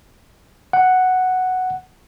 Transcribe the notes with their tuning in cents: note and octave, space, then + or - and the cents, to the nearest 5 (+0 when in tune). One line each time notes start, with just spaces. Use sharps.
F#5 +0